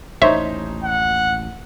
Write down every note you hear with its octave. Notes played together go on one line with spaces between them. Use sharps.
A1 D#2 D#4 C5 C#5 E5
F#5